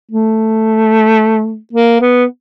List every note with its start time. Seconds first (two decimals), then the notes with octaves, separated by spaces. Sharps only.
0.11 A3
1.73 A#3
2.01 B3